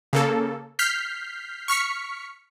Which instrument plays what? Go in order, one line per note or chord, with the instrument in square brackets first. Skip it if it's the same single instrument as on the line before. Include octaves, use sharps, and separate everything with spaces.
[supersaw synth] C#3 A#3 A4
F6 G6 B6 C7
C#6 F6 B6 C#7